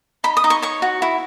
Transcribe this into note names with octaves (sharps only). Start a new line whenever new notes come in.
D#4 B5
D#6
D#4
C#6
C#5 C#6
F#4
E4